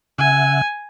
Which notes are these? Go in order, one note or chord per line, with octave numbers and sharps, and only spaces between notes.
C#3 E5 F#5 G#5